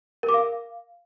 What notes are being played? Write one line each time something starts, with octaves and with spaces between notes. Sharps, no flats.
A#4
D6
F5